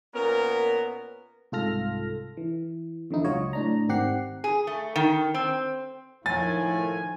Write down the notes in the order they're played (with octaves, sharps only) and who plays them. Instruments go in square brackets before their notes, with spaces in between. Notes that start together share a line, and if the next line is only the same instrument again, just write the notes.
[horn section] A#2 B3 C#4 A#4
[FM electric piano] C2 G#2 F4 A4 F6 A#6
E3
E2 D3 F3 D#4 E4
C#2 F#3 F4 C#5 D#5
A2 D4 A#5
G#1 D#3 C4 G4 F#5 C7
[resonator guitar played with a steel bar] G#4
A3
D#3
C4
[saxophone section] A2 [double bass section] D#3 F3 [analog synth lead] G#5 [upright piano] A6